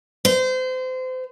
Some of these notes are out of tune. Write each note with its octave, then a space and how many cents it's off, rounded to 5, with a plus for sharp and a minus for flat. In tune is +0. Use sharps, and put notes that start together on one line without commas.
C5 -30